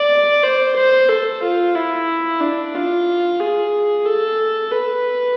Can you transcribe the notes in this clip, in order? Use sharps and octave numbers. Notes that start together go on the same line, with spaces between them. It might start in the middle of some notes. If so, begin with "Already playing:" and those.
Already playing: D5
C5
C5
A4
F4
E4
D4
F4
G#4
A4
B4